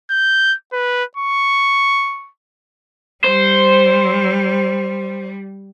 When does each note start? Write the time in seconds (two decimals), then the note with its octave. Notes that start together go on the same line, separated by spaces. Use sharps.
0.10 G6
0.73 B4
1.16 C#6
3.25 G3 C5